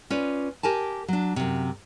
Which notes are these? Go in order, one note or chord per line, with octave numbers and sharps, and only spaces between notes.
C#4 F4 B4 D5
G4 A#4 G#5 A5
F#3 D4
F#2 C3